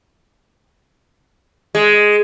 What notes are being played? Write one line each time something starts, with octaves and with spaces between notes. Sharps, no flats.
G#3